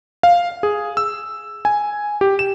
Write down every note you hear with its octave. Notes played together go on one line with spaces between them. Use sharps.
F5
G#4
E6
G#5
G4
E7